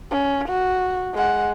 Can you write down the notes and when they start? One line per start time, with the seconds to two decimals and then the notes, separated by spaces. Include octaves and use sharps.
0.11 C#4
0.48 F#4
1.14 G#3 F#5